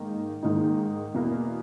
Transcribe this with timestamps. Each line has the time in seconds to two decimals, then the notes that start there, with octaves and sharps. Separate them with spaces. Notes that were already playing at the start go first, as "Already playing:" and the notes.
Already playing: G#2 D#3 A#3 D#4
0.43 G#2 D#3 A#3 D#4
1.14 E2 B2 A#3